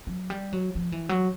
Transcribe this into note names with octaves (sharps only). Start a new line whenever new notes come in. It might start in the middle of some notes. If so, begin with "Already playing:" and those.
F#3
G3
F#3
F3
E3
F#3